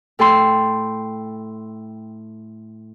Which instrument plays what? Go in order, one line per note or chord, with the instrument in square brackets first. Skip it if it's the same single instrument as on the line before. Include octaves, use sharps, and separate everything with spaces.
[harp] A2 A4 G5 C6